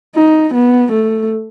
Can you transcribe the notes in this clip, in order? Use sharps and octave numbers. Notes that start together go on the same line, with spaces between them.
D#4
B3
A3